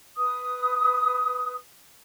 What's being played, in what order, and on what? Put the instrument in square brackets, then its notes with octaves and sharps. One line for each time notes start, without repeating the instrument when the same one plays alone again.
[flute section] B4 D#6